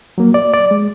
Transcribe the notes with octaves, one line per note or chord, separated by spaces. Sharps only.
F#3 A#3
D5
D5
G#3